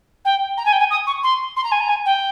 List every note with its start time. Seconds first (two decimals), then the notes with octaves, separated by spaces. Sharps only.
0.25 G5
0.57 A#5
0.65 G#5
0.72 G5
0.79 G#5
0.90 D#6
1.07 C#6
1.23 C6
1.56 C6
1.64 A#5
1.72 G#5
1.80 A#5
1.89 G#5
2.06 G5